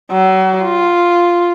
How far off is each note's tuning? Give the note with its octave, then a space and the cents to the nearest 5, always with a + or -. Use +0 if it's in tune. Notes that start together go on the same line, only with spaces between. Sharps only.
F#3 +35
F4 +0